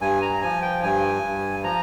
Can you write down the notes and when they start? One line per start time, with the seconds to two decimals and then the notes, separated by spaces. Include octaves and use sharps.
0.01 G2 G#5
0.22 A#5
0.42 F3 G#5
0.62 G5
0.83 G2 G#5
1.23 G2
1.63 F3 A#5